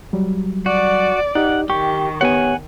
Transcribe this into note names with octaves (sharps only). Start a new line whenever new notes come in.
F#3 G3
F#4 D5
D#4 G4 F#5
D#3 G4 C#6
B3 G4 C#5 F#5 G#5